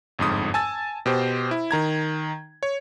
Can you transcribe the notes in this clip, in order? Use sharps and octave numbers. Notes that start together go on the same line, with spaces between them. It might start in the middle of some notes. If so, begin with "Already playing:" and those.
G1 F2 G#2 D#6
G#5 A5 E6 A6
B2 G4 C5
E4
D#3 A#5 G#6
C#5